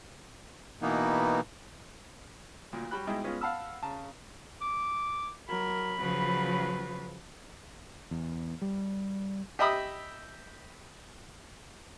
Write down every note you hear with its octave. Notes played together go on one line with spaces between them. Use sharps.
B2 E3 A#3 B3 D#4
D2 A#2
F#3 G3 F#4 G4 B5 F#6
G#2 B2 G#3 D#4 E4 G5
G#3 B3 C#4 F4 B4
F5 F#5 A5 B5 E6 F6
C#3 A5 A#5
D6
F#3 A#4 B5
C#3 F3 F#3 B4
E2
G3
G4 D#5 E5 B5 D#6